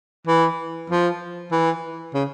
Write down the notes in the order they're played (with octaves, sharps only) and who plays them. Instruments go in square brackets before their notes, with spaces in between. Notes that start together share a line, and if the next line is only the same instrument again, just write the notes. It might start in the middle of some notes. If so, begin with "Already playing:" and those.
[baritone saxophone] E3
F3
E3
C#3